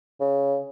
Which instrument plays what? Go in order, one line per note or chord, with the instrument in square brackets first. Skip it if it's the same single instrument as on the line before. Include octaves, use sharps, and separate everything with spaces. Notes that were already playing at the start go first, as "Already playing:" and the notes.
[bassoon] C#3